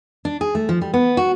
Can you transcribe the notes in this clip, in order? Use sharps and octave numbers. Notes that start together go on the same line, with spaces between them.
D4
G#4
A3
F3
G3
B3
F#4